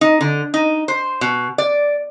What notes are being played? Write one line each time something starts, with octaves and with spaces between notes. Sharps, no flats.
D#4
D3
D#4
C5
B2
D5